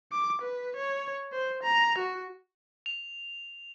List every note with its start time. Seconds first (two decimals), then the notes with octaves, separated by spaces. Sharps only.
0.12 D6
0.41 B4
0.76 C#5
1.32 C5
1.63 A#5
1.98 F#4
2.86 F7